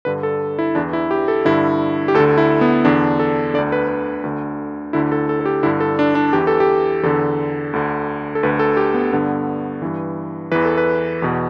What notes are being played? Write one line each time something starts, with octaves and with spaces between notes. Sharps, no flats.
G2 D3 B4
A4
E4
E2 E3 D4
E4
G4
A4
G2 D3 E4
G4
D2 A4
D3
E4
B3
E2 D3 D4
A4
D2 D3 D5
B4
B4
D2 D3
D2 D3 E4
A4
A4
A4
G4
G2 D3 E4
A4
D4
D4
E2 E3 G4
A4
G4
E2 D3 A4
D2 D3
A4
D2 D3 B4
A4
G4
B3
G2 D3 B3
G2 E3
E2 E3 B4
A4
B4
E2 B2